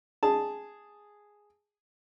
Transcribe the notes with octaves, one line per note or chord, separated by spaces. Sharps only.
G#4 A5